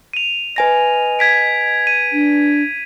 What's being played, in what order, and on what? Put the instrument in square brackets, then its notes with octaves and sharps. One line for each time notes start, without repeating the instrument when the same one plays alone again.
[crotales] D#7 F7
[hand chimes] B4 G#5 A#6 [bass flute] D#5
[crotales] G#6 B6 D7
D#7
[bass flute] D4